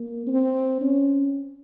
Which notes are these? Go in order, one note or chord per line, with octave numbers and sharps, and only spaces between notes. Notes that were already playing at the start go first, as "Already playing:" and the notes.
Already playing: A#3
C4
C#4